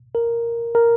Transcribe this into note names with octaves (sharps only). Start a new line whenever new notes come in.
A#4
A#4